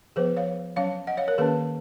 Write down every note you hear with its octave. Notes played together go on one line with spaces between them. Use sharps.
F3 B3 G#4 B4
C#5 F5
F#3 C#4 C#5 F5
D#5 F#5
C#5 F5
A#4 C#5
D#3 A#3 C#4 G#4 B4